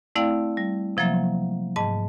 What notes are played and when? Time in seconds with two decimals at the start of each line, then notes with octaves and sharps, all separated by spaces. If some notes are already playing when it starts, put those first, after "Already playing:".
0.16 A3 C4 E4 D5 F5 G5
0.57 G3
0.97 C3 F3 F#3 A#3 E5
1.76 G#2 D#5 A5